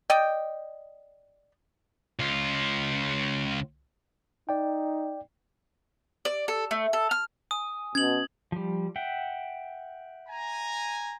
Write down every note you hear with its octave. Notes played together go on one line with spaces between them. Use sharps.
D5 D#5 G5
C#2 F4
D#4 D5 G5
D5
A4
A3
A4
F6
G#5 D#6
B2 C#4 G#6 F#7
F3 G3
E5 F#5 G5
G#5 A#5